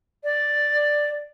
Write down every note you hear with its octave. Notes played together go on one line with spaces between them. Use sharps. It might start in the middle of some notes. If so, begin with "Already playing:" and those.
D5